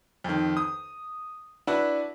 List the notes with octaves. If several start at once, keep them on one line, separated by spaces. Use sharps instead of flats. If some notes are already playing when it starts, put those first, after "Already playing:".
F2 D#3
D#6
D4 E4 F#4 B4